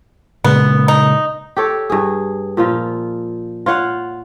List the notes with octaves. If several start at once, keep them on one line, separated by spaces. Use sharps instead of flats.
A#2 C#3 G#3 B3
D#4
G4 A4 C#5
G2 G#4
A#2 F3 F4
F4 C#5 F5 F#5